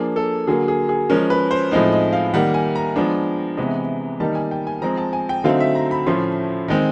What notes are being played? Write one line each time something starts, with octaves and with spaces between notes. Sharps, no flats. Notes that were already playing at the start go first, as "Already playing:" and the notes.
Already playing: F3 A#3 D4 G#4
A4
D3 F#3 A#3 G#4
G#4
G#4
F3 G#3 C#4 A#4
B4
C5
A2 F3 G#3 C4 D#4
D#5
F5
D#3 G3 A#3 F#5
G#5
A#5
F3 G#3 B3 D4
C3 E3 G#3 B3
D#3 G3 A#3 D#4 A5
G#5
G5
G#5
F3 G#3 C4 A#5
A5
G#5
G5
D3 F#3 A3 C4 D#4 F5
E5
A#5
B5
A2 F3 A3 C#4 C6
D#3 G#3 C4